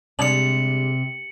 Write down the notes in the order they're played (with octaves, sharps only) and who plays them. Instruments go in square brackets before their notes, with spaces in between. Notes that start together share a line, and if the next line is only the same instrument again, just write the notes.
[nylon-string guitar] C3 [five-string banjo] G3 G#3 D4 [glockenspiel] C#7 F#7